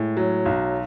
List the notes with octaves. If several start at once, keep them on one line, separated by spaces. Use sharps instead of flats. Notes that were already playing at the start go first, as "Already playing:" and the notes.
Already playing: A2 G#3
F#3
B1